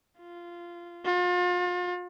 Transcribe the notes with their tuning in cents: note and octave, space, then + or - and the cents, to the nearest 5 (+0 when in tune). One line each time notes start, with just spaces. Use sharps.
F4 -15
F4 +35